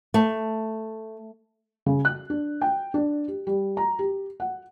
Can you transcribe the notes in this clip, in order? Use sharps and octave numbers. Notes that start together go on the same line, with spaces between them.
A3
C#3
F#6
D4
G5
D4
G4
G3
A#5
G4
F#5